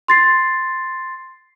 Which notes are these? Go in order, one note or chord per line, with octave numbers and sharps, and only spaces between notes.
C6 A6 C7